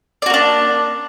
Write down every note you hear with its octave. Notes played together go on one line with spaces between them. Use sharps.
A#3 D4 F#4 D5